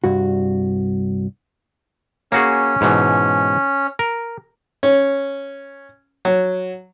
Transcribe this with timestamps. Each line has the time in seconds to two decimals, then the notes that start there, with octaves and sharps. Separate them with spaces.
0.04 C2 G2 F#4
2.32 A#3 C#4 F#4 G#4
2.81 G#2 B2 E3
3.99 A#4
4.83 C#4
6.25 F#3